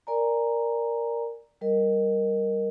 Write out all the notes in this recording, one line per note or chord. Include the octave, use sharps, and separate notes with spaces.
A#4 D5 G#5 A#5
G3 A#4 D#5